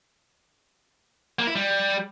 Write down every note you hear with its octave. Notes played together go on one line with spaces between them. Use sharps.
A#3
E4
G3